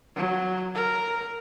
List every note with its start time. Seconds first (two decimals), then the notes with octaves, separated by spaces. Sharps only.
0.16 F#3
0.75 A#4